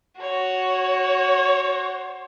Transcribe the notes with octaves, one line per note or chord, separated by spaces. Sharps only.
F#4 C#5